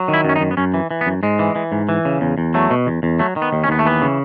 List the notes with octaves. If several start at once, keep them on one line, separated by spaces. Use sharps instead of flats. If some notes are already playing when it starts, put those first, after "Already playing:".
Already playing: F#3
D#3
E4
F#2 C#4
D#4
F#2
B3
F#2 C#4
E3
E3
B3
F#2
G#2 G#3
E3
E3
G#2
E3
C#3
E2
E2
F#3 A3
B2
E2
E2
F#3 A3
D#3
B3
D#2
C#4
D#2 B3
A3
E3 B3
C#3